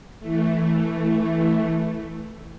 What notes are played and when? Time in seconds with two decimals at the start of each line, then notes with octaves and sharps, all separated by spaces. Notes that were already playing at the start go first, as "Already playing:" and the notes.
0.20 E3 A3